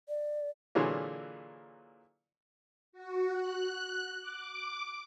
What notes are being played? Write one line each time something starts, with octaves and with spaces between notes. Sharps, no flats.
D5
A#2 D3 E3 F#3 G#3 A#3
F#4
F#6
D6